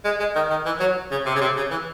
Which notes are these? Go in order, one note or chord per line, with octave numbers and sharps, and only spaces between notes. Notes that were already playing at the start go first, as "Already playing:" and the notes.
G#3
G#3
D#3
D#3
E3
F#3
C#3
C3
C#3
C3
C#3
E3